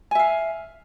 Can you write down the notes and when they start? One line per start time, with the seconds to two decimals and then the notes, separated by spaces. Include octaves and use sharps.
0.11 G#5
0.15 E5
0.19 F5